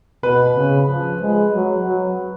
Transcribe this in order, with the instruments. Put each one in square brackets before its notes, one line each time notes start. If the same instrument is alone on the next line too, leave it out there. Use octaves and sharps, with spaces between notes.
[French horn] B2 [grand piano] B4
[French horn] C#3
F3
G#3
F#3
F#3